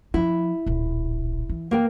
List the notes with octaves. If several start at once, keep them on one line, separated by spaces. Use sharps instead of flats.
F3 E4
D1 A#1
E3
A#3 A#4 G5